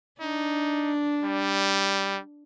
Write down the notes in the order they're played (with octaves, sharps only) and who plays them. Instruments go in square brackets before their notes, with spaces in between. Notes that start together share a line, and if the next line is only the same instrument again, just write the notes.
[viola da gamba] D4 [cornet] D#4
[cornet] G3